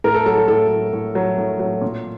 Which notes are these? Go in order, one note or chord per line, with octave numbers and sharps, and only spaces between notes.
A2 A#4
A4
F#3 A4
A4
A2 A4
F#3
A2
F#3
A2
F#3
A#2